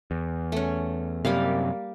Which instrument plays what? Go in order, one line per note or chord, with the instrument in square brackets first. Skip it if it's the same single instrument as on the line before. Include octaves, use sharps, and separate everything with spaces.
[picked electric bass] E2
[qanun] A3 C#4
[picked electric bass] F#2 C3 [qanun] G3 A#3 F5